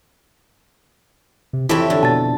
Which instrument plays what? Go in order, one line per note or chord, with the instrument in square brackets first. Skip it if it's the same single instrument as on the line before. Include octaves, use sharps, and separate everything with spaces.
[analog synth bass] C3
[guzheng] F2 E3 [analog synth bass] E4 [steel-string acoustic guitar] G4 A4 C#5
[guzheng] D3
[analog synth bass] B2 [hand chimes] A5 A6